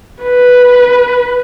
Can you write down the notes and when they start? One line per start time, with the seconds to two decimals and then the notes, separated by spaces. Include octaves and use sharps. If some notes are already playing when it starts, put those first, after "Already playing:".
0.23 B4